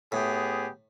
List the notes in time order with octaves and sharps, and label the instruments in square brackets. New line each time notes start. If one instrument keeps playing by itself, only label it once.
[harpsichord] A2 [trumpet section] B3 G4 G#4